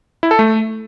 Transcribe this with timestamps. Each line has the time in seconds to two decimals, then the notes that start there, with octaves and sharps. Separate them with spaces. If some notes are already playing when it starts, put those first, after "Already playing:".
0.23 E4
0.31 A4
0.39 A3